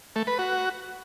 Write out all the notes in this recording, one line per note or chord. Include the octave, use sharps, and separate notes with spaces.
A3
B4
F#4